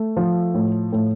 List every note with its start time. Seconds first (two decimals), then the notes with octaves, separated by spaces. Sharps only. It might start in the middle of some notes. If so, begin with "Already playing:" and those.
Already playing: A3
0.17 F3
0.54 A2
0.92 A2